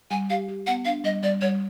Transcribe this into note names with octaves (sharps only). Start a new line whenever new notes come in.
G3 G#5
G4 F5
G4
B3 F#5
D4 F5
G3 D#5
G3 D5
G3 C#5